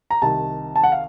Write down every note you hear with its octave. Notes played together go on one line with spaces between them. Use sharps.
A#5
C2 C3 D#3 A5
A5
F#5
F5